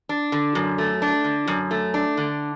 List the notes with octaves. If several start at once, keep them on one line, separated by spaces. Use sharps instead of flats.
D4
D3
F#2
A3
D4
D3
F#2
A3
D4
D3